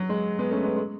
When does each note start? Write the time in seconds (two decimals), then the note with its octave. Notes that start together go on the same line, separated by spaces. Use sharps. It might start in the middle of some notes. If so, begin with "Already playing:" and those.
Already playing: F#3
0.09 G#3
0.39 G#3 B3
0.51 A3 C#4
0.63 G#3 B3
0.76 G#3